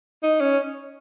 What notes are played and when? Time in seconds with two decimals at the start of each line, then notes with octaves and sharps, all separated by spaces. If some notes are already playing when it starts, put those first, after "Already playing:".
0.23 D#4
0.40 C#4